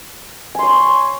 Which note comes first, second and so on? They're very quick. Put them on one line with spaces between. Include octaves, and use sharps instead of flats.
G#5 C6 C#5